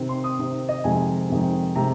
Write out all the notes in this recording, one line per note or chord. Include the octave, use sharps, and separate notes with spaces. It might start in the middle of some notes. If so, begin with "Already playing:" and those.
Already playing: C3 D#3 C4
C6
D#6
C3 D#3 C4
D#5
F2 C3 D#3 G#3 G#5
F2 C3 D#3 G#3
C3 D#3 G#3 A#5